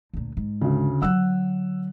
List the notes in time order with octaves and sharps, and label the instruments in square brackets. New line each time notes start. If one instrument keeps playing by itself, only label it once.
[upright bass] D2 A#2
G#2
[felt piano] D2 C#3
[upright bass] D3 F#3 [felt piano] F#5 E6 F#6